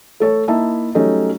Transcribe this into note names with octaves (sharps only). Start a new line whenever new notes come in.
A3 A4 C#5
A#3 D#4 E4 E5 A5
F#3 G3 A3 C#4 D#4